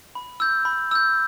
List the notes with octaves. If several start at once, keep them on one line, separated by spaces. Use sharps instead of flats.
B5
E6 G6
B5
E6 G6